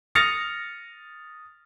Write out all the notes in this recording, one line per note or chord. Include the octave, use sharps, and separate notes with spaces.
D#6 F6 A6 A#6 C#7 F7